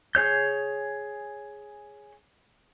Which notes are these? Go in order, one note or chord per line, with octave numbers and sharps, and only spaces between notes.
G#4 C#5 G6